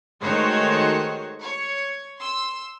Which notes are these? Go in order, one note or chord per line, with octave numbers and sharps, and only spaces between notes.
D#3 G#3 A3 F#4 C5 C#5
C#5
C6 E6